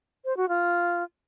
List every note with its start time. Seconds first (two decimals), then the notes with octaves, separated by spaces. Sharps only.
0.25 C5
0.37 F#4
0.49 F4